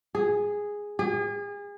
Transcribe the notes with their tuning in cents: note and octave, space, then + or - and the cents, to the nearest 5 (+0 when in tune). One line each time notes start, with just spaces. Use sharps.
G#4 -5
G#4 -35